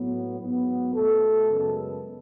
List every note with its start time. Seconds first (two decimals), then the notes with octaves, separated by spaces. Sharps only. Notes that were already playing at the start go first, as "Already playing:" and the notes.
Already playing: A2 F#3 B3
0.40 G#2 F#3 B3
0.94 B2 A3 A4
1.49 F#2 C#3 G#3 B3